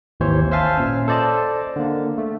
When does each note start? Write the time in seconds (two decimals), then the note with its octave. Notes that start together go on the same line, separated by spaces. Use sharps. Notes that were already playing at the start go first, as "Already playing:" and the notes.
0.20 G#1 D#2 E3 C5 C#5
0.52 C5 E5 F5 G#5 A5
0.77 A#2 C#4
1.08 A4 C5 D5 D#5 A5
1.76 D3 A#3
2.18 A3